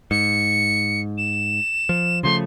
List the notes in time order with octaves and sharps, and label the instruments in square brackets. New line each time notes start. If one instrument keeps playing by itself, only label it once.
[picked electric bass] G#2 [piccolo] C#7
[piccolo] E7
[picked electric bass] F3
[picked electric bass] C#3 F3 A3 [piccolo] C6